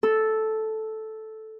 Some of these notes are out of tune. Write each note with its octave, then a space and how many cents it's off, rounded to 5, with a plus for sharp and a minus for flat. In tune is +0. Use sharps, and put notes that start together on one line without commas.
A4 -5